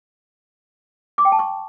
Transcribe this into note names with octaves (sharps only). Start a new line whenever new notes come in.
D6
G5
A5
C#6